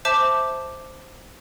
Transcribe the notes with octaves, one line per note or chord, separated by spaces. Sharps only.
C5 E5 A5 D6